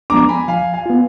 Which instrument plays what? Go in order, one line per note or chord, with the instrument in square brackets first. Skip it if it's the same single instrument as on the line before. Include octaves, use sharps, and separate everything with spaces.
[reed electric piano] F3 G#3 B3 D4 [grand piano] A#5 D6
[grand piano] G#5 B5
[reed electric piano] F3 [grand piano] F5 G#5
[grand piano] F5 G#5
[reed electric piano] B3 F4